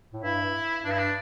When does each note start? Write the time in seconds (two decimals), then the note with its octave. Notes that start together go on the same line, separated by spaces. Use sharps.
0.13 A2
0.23 G2 E4
0.84 G2 D4
0.91 E4
0.99 D4